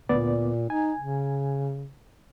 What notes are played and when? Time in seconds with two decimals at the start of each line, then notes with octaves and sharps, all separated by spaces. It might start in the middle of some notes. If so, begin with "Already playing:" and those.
0.09 D2 A#2 B3 D5
0.70 D#4 G#5
0.99 C#3